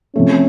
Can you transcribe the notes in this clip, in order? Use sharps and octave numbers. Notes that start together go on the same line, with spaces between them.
C3 F3 A3 C#4